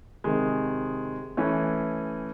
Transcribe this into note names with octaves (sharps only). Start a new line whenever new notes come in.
C3 D#3 G#3
E3 A3 C#4